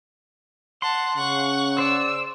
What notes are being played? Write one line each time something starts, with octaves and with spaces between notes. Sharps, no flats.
F#5 A5 C6
C#3 F#5 C#6
C5 D5 E6